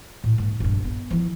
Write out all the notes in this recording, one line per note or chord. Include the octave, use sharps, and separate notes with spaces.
A2
G#2 A#3
A#1 G2
B3
E3 F3